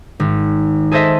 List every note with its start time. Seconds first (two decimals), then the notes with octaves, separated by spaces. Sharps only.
0.20 G#1
0.91 G#4 A4 C5 D#5 E5